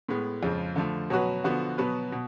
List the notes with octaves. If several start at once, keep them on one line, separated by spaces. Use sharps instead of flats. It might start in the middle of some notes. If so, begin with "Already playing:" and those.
A2 G#3 B3
F2 C#3 F3 G#3
D3 F3 A3
B2 F#3 C#4 F#4 B4
D3 F3 B3 F#4
B2 F#3 B3 F#4 B4
B2